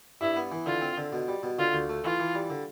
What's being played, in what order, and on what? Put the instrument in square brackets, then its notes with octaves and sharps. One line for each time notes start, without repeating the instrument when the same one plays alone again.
[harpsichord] G2 [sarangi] E4
[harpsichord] B3
E3
[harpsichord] D3 [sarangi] F4
[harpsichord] C4
D3
B2
G3
B2
[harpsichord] D3 [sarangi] F4
[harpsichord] D2
A3
[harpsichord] E3 [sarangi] F4
[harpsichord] E3
G3
D3